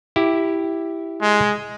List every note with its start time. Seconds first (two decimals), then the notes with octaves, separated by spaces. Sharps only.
0.16 E4 G4
1.22 G#3